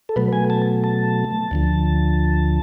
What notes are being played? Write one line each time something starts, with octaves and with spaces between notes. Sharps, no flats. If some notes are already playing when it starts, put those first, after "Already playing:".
A4
B2 F#3 A3 B4
G#5
A5
A5
D2 D3 F3